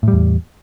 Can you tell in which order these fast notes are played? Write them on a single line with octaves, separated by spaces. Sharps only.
A2 G3 E2